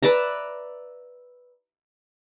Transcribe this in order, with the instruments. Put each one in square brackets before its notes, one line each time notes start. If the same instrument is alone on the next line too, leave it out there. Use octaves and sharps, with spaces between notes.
[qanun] B4 D5 E5 A#5